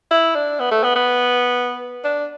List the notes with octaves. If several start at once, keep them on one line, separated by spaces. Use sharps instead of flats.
E4
D4
B3
A3
B3
B3
D4